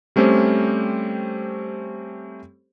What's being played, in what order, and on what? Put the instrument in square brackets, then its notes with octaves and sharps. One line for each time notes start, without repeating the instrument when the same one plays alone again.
[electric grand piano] G3 A3 C4 C#4 G4 C5